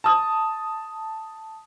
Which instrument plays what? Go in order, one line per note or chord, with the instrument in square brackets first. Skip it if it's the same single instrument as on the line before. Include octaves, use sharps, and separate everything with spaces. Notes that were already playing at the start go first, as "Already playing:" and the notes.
[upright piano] A5 D#6